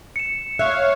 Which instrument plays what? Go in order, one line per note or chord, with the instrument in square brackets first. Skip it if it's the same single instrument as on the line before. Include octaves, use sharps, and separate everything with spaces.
[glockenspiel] C#7 E7
[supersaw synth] C#5 F5 [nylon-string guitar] E5 [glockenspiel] F#6